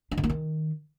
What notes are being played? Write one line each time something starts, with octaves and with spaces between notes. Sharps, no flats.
D4
D3
A#3
D#3